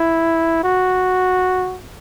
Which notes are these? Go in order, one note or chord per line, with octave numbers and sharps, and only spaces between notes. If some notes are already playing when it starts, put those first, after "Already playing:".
Already playing: E4
F#4